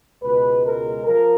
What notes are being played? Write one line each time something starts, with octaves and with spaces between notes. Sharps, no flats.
C#2 B2 G#3 B4
A#4
F3 A#4